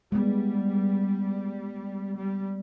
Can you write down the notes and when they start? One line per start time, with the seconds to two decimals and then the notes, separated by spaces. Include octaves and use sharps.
0.12 G3 G#3 B3
2.16 G3